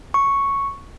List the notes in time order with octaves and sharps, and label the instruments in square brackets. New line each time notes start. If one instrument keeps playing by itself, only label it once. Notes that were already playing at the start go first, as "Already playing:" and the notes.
[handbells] C#6